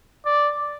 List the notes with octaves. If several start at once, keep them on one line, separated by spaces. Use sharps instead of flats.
D5